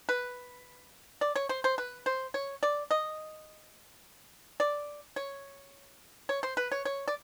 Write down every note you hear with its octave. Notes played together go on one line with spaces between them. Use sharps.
B4
D5
C#5
C5
C5
B4
C5
C#5
D5
D#5
D5
C#5
C#5
C5
B4
C#5
C#5
D5